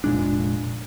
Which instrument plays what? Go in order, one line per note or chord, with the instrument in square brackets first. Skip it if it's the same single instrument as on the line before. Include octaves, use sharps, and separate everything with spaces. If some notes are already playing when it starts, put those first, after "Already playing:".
[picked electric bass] F1 A#2 G#3 D4